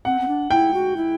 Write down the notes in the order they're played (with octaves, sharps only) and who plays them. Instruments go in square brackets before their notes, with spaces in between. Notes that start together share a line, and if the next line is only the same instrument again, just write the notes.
[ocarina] C4 [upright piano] F#5
[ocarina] C4
D4
[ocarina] E4 [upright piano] G5
[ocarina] F#4
E4